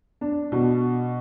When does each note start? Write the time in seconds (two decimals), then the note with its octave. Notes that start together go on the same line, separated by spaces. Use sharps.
0.21 D4
0.52 B2